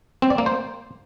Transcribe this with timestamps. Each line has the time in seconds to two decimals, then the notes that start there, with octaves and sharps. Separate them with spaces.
0.22 C4
0.30 D5
0.38 A#3
0.46 C5